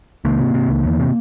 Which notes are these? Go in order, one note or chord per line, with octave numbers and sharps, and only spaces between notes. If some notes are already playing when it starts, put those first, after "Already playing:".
C#2 A#3
C3
C3
C#2
E2
C3